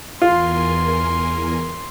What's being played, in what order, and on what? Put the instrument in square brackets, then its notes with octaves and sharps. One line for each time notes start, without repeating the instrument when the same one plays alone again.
[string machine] E2 A#4 G#5 [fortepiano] F4 [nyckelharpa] C6